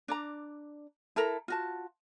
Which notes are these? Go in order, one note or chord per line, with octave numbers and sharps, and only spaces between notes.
D4 D5 A#5
E4 A4 A#4 A#5
F4 F#4 A5